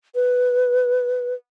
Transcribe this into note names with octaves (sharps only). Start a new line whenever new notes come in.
B4